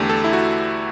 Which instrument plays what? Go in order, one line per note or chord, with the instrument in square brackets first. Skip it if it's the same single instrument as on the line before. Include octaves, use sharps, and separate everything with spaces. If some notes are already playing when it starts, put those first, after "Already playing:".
Already playing: [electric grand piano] E2 D3 A3 G4
A4
E4
F#4